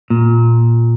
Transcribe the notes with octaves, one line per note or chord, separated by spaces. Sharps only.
A#2